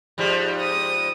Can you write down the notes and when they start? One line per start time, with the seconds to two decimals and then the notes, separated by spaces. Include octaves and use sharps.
0.18 G#2 F3 G3
0.60 D#6